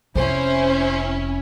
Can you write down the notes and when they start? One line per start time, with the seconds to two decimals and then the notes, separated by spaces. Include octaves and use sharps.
0.15 F1 C#4 E4 C5